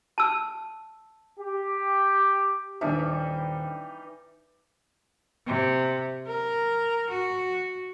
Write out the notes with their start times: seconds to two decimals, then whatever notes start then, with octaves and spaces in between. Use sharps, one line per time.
0.18 A5 E6
1.39 G4
2.81 D#1 E3 G3 D4 D#4 E5
5.46 C3
6.27 A#4
7.10 F#4